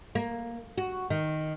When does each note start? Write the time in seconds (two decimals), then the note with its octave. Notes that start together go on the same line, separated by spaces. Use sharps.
0.15 A#3
0.78 F#4
1.10 D#3